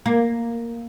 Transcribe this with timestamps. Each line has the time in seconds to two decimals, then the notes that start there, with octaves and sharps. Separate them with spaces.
0.06 A#3